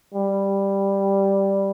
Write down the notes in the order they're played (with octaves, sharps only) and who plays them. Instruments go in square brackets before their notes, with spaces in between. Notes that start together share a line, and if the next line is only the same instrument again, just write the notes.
[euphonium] G3